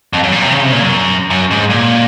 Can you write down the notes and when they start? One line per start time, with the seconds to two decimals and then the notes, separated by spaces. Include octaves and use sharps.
0.13 F2
0.23 F#2
0.32 A#2
0.42 C3
0.52 C#3
0.62 C3
0.72 A#2
0.82 F#2
1.30 F#2
1.51 G#2
1.70 A#2